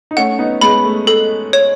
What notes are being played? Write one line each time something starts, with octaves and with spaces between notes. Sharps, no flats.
D#4
A3 C#4 F#5
B3 D#4
G#3 B3 B5
A3
A4
C#5